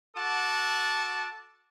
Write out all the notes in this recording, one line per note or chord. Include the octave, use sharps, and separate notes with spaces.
F#4 A4 F#5 A5 D6